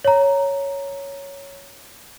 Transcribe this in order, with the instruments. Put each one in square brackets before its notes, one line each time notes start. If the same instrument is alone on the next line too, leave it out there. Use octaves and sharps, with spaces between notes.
[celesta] C#5 A#5